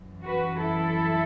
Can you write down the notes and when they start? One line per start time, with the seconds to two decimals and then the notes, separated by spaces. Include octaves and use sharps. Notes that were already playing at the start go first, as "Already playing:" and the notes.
Already playing: F#2 E3
0.25 F#4 B4
0.61 E4 A4